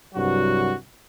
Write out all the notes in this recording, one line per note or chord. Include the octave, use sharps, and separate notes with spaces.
C2 G2 F#3 F#4